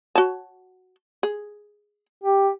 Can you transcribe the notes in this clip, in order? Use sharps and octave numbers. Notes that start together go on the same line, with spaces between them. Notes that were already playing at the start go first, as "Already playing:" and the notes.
F#4 C#5 A5
G#4
G4